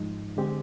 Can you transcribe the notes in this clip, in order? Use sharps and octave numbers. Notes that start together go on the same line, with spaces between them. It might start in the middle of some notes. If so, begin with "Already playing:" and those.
Already playing: G#2 F3 G#3 D#4
D3 G#3 C4 G4